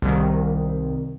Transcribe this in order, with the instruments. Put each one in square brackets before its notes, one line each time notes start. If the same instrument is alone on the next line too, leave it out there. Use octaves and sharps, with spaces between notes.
[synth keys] C2 D#3